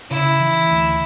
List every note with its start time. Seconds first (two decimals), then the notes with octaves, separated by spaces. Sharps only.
0.10 C#3 E4
0.40 E3
0.70 D2